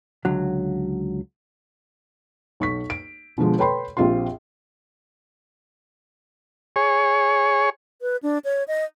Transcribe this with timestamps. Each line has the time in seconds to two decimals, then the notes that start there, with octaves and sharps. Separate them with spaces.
0.25 C#2 D3 F#3
2.60 B1 C#6 B6
2.90 D7
3.38 B2 D3 F3 G#3
3.58 A4 B4 C#5 G5 B5 C6
3.97 A#1 C4 F4 G4 C6
6.76 G#4 C#5
8.02 B4
8.23 D4
8.45 C#5
8.68 D#5